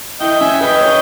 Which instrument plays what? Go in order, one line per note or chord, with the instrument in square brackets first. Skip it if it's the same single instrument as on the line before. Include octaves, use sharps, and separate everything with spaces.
[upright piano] E4 [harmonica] D#5 G5
[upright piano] C#4 [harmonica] E5 G#5
[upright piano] B4 [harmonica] D#5 G5
[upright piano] C#5